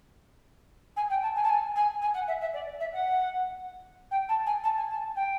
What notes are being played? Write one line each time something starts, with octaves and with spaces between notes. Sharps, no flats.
G#5
G5
A5
G#5
A5
G#5
G#5
G#5
F#5
E5
E5
D5
E5
F#5
G5
A5
G#5
A5
G#5
A5
G5